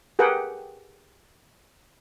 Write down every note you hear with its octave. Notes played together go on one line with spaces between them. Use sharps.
G4 G#4 A#4 B4 F#5 G5